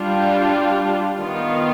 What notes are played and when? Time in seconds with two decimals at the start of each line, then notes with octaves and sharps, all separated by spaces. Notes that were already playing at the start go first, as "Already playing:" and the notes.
Already playing: G3 D4 F4
1.19 D#3 B3 F4